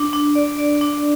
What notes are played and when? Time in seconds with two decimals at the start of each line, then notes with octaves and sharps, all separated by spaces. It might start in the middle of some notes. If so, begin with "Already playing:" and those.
Already playing: D4
0.13 D4
0.35 D5
0.59 D5
0.81 D4